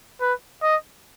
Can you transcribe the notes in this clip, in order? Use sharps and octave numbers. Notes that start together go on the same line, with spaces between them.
B4
D#5